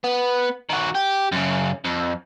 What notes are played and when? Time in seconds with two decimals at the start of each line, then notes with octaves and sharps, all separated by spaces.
0.04 B3
0.69 D#3 F#4
0.95 G4
1.32 F#2 C#3
1.84 F2